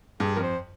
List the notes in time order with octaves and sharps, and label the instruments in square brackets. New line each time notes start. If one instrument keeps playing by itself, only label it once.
[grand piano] G2 [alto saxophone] G#4
[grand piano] F2 [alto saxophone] A#4
[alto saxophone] C5